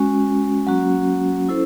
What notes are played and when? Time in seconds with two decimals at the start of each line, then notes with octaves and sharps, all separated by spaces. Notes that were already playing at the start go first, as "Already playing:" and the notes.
Already playing: G#3 C#4 F#4
0.67 F#3 A#3 C#4 F#4
1.48 C#4 E4 A4 C5